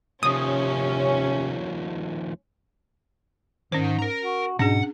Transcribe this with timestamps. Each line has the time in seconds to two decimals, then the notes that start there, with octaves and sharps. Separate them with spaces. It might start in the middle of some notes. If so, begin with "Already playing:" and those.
0.23 D#2 C3 F3 C#4 D#6
3.72 G#2 D#3 C#4 C5
3.99 A#4 A#5
4.22 F#4
4.59 G#2 B2 C#4 D4 G#4 F#5